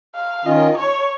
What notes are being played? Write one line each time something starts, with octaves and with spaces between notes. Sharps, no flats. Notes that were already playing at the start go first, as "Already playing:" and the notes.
F5
D#3 C#4 F4 D#5
C#5